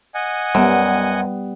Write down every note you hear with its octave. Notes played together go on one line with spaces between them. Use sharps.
D#5 F#5 G#5
F#2 G3 B3